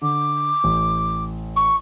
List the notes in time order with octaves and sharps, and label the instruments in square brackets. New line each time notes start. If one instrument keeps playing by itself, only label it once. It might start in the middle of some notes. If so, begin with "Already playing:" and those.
[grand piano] D3 [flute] D6
[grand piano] A1
[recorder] C#6